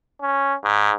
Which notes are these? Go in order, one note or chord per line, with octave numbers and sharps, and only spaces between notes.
C#4
G#2